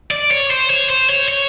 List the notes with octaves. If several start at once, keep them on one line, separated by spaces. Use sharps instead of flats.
D5
C#5
C5
C#5
C5
C#5
C#5